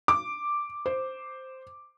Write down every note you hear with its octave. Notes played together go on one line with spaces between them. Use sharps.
D6
C5